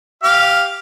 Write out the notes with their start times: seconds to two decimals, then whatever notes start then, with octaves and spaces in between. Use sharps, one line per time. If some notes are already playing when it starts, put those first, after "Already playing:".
0.23 G4 F5